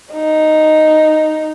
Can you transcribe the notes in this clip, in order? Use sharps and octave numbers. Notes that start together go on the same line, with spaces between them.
D#4